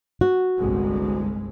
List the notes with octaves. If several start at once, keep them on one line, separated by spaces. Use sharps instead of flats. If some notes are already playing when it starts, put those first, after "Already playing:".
F#4
G1 C2 G#3